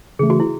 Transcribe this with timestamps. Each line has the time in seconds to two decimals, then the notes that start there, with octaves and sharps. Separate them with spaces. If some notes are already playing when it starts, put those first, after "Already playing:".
0.19 C#3 E3 A3 G#4
0.30 F#4
0.40 E4